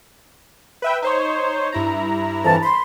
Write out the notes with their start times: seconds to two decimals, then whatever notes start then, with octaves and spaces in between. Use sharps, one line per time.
0.82 B4 E5 G5
1.02 D#4 C5 C#5
1.72 G2 E4 A#5
2.45 F2 E3 A5
2.63 B5 C6